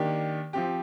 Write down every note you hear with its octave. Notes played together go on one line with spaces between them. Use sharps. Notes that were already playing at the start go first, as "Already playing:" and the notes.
Already playing: D#3 A#3 D4 G4
F3 C4 G4